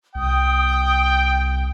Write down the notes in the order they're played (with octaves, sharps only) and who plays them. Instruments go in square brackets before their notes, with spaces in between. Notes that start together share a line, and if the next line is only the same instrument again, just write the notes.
[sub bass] C2 [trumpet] G5 [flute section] D#6